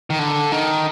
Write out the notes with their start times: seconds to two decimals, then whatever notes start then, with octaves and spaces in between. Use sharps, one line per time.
0.10 D#3
0.19 D3
0.52 D#3